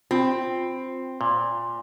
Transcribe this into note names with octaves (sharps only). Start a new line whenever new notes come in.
C4 F4
A#2